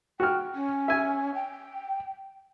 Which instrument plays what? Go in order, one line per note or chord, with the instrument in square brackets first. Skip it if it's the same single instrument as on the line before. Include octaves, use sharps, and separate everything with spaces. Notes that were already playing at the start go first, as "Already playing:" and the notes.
[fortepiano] F#4 F6 [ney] G5
[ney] C#4
[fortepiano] E5 G#5
[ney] G5